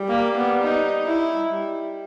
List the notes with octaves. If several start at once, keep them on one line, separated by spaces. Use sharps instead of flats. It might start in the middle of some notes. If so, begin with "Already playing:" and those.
Already playing: G3
A#3
B3
D#4
E4
G3